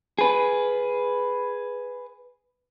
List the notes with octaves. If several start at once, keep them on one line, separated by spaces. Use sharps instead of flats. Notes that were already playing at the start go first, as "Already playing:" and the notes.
G#4 B4